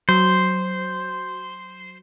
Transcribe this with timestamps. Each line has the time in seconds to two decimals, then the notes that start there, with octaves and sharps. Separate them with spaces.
0.09 F#3 C5